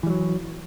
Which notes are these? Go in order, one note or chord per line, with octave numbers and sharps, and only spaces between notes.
E3 F#3 G3